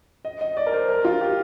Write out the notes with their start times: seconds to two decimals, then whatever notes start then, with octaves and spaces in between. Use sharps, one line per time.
0.25 D#5
0.41 D#5
0.57 D5
0.67 A#4
0.73 C5
0.89 A#4
1.05 F4
1.21 G4